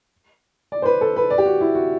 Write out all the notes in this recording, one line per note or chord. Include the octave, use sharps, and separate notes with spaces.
D5
C5
B4
A4
B4
D5
G4
F#4
E4
F#4